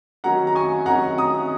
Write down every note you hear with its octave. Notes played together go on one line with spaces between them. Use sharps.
D#3 F#3 C#4 F#5 A#5
A#5
G#5 C#6
D#3 F#3 C#4 F#5 A#5
A#5 D#6